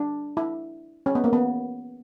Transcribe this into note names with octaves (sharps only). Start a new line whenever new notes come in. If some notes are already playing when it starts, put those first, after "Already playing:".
Already playing: D4
E4
C#4
B3
A#3
B3